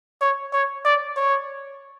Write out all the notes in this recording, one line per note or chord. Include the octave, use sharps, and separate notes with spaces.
C#5
C#5
D5
C#5